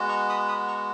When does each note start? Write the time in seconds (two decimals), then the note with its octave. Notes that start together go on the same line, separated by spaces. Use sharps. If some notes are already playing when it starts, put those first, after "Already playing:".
Already playing: G#3 B3 F#4
0.09 A#5 C#6
0.30 B5 D#6
0.48 B5 D#6
0.68 A#5 C#6